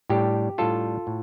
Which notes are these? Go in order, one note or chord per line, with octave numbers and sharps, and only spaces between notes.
A2 G3 D4 G4
A2 G3 D4 F4 A4
A2